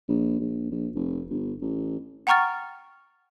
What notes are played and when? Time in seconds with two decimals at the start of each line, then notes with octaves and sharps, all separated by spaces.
0.08 A#1
0.40 A#1
0.71 A#1
0.95 F1
1.30 G1
1.61 A1
2.27 F#5 G5 A#5 C#6 F6 A6